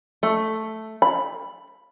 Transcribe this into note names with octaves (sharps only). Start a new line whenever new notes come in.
A3
B5